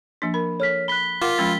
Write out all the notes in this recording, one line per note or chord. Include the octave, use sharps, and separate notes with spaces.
F3 A#3 D4
A#4 B5
A4 C#5 F6 B6
B5 F#6 B6 G7
F4 A#4 F#5 D6
F3 G#3 C#4 B5 E6 A6